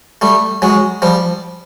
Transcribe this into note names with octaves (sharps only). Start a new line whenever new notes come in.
G3 A3
F#3 G#3
F3 G3